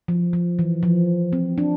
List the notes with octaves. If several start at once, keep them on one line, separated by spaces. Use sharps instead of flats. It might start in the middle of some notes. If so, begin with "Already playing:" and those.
F3
F3
E3
F3
C4
D4